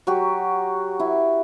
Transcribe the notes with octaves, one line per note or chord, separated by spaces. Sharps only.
F#3 F#4 G4
E4